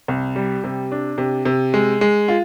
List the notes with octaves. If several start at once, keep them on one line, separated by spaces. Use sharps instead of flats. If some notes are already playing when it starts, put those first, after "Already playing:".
C2
G3
C3
D4
C3
C3
G#3
G#3
F4